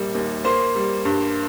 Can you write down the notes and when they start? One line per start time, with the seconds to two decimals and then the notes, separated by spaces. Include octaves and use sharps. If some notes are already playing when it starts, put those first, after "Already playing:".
Already playing: A#1 G3 A#3
0.15 D#2
0.44 A#3 C5
0.75 G3
1.05 G2